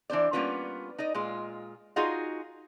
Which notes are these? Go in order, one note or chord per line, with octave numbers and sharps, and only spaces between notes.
E3 D4 C5 D5
G3 A#3 B3 C#4 F4 B4
D#4 D5 D#5
A#2 G#3 F4
D#4 F4 F#4 G#4 D#5 F5